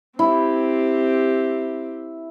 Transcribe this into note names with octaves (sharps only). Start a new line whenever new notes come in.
C4 E4 G4